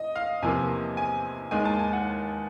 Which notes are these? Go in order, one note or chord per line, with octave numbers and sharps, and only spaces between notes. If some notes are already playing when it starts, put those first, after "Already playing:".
Already playing: D#5
F5
E2 C3 F3 A#3 G#5
G#5
D#2 D#3 G#3 G#5
A5
G#5
F#5